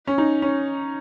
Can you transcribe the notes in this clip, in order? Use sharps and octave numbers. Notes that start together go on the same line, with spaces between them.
C#4
D#4
C#4